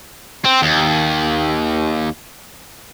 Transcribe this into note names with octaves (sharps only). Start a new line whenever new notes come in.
C4
D#2